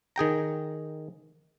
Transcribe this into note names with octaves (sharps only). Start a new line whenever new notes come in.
D#3 G#4 G5 A#5